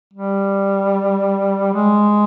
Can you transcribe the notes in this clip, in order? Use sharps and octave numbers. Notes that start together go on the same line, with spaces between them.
G3
G#3